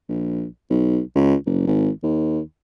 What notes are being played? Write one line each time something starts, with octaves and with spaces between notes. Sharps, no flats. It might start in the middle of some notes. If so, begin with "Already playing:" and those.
A#1
B1
C#2
F#1
G#1
D#2